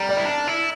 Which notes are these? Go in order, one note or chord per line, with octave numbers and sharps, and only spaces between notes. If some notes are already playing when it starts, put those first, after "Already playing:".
Already playing: G3 A#5 F6
D5
E4
D4
E4